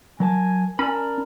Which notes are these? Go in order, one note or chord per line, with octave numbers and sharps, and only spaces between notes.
F#3 A#4 G#5 A5
C#4 A#4 D5 A5 B5